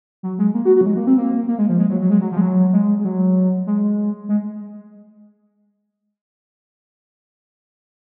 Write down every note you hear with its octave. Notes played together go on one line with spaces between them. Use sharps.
F#3
G#3
A#3
F#4
F#4
F#3
G#3
A#3
C4
A#3
A#3
G#3
F3
G#3
F#3
F#3
G#3
F#3
F3
G#3
F#3
G#3
G#3
F#3
G#3
G#3